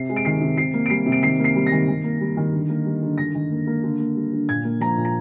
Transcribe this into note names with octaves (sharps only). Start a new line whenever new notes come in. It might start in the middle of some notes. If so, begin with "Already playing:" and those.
Already playing: C3 C7
G#3
D7
D#3 C7
C3
C3 C7
A#3
D7
G3 C7
C3
D7
D#3 C7
A#3
C7
G3
A#6
D#3
D#3
A#3
G3
D#3
D3
A#3
G3
D3
D#3 A#6
D#3
A#3
A#3
D3
A#3
G3
D3
A#2 G#6
A#3
F3 A#5
A#2
A#5